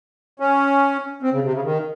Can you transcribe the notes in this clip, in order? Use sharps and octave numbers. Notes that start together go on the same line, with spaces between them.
C#4
C4
C#3
C3
C#3
D#3